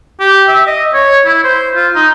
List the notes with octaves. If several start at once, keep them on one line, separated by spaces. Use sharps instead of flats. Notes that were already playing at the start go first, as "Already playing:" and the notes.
G4
E5
D#5
C#5
E4
C5
F4
D#4